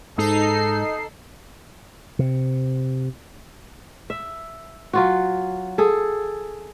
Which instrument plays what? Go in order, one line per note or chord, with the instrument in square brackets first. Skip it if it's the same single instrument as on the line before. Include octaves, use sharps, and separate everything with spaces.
[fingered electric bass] G#2 [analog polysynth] D#4 C7 [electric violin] A4
[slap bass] C3
[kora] E5
F#3 F4 F#4
G#4 A4